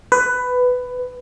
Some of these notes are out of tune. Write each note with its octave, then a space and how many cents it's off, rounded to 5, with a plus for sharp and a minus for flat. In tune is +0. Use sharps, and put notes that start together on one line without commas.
B4 +15